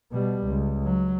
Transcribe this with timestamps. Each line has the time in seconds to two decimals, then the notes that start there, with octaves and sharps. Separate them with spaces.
0.12 B2 G3
0.45 C#2
0.84 F#3